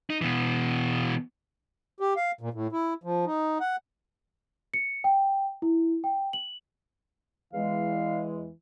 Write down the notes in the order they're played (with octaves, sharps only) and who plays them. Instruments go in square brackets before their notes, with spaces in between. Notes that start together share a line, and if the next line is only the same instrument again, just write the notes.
[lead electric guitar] D#4
B2 E3
[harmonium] G4
F5
A#2
A2
E4
F3
D#4
F#5
[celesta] C#7
G5
E4
G5
F#7
[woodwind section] E2 G#3 [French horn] E3 [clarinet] F5